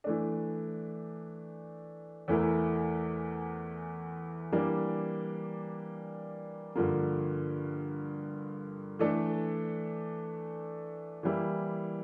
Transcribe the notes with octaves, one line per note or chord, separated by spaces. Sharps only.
E3 A3 D4
E2 E3 A3 E4 A#4
E3 G3 A#3 D4
G2 D3 F3 A#3
E3 A3 D4 A4
E3 G3 A#3 E4